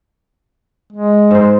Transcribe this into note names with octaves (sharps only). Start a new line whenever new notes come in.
G#3
G#2 C5